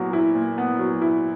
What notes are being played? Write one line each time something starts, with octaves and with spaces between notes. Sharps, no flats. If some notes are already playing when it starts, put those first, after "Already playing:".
Already playing: A#2 F#3 B3 E4
E4
A#2
B3
F#3
E4